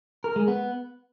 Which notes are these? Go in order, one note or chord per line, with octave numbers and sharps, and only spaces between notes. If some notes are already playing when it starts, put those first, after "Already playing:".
A#4
G#3
B3